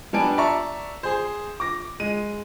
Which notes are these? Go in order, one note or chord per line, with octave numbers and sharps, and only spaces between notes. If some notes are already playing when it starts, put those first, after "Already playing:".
G3 B3 D4 G#5 A5 D7
D5 E5 A5 A#5 C#6
G#4 C5
D6 A#6
G#3 D#7